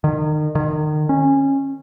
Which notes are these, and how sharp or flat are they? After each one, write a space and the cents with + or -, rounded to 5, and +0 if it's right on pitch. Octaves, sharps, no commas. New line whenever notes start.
D#3 -35
D#3 -35
C#4 -20